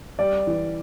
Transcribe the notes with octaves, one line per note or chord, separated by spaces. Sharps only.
G3 D5
E3